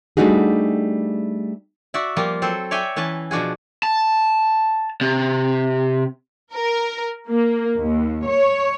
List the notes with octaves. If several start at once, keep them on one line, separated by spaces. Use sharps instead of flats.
G3 A3 D4 D#4 F#4 G#4
F#4 D5 E5
F3 G3 A#3 F4
F#3 C4 A4 C5
C#5 D5 E5 G5 G#5
E3 C#4 B4 A5
B2 F3 D4 F#4 G#4
A5
C3
A#4
A#3
D#2
C#5